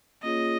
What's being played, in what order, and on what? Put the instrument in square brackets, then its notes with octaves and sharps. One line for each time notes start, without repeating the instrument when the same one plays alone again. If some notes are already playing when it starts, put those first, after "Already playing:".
[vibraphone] A#3 C#4 F4 G#4 C#5 [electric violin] D#5